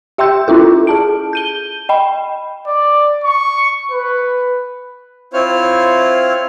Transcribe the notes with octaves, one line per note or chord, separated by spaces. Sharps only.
G4 E5 G5 C6 E6 G6
C#4 E4 F4 A4
G#4 A5 D7
G6 D#7 G7
D#5 G5 B5
D5
C#6
B4
C4 E4 F4 C5 C#5 F6